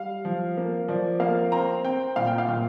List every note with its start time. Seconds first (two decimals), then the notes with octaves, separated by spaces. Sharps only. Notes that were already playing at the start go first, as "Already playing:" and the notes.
Already playing: G3 F5
0.25 F3
0.57 A#3
0.88 F3 D5
1.20 A#3 F5
1.52 C4 A#5
1.85 C4 G5
2.16 A#2 F5
2.27 G5
2.38 F5
2.48 A#2